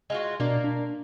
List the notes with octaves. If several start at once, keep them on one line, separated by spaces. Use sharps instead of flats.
G#3 F4 F#4
B2 A#3 D4 A#4 D5
D4